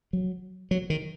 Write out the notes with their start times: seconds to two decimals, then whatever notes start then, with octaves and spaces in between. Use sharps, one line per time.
0.13 F#3
0.71 F#3
0.90 D#3